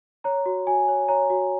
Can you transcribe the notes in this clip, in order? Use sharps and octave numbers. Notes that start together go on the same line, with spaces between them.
C#5 A#5
F#4
F#4 G#5
C#5
C#5 A#5
F#4